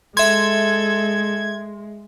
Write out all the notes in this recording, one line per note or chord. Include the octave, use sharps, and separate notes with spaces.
G#3 A4 E5 C6 G#6